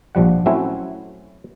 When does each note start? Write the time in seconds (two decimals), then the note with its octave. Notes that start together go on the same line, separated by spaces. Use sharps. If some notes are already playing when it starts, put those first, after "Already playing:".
0.15 A#1 F3 G3 F#5
0.46 F#3 A3 C4 C#4 E4 F#4